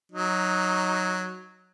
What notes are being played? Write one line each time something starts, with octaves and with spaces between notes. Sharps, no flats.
F#3 D#4